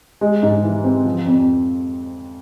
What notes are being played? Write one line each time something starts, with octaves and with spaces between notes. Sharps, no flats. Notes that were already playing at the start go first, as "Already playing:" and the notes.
G#3
G#2
E3
C4
F3
F2